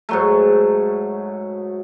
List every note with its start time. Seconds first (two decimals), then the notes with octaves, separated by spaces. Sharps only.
0.09 G#2 F#3 A3